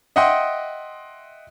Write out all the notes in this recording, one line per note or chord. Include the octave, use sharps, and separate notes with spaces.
D#5 E5 F#5 G5 C6 D#6